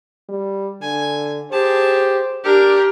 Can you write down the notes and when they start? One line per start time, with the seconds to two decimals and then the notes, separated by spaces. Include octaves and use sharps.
0.29 G3
0.82 D3 G#5
1.52 G4 G#4 C5 A5
2.44 D4 G4 A#4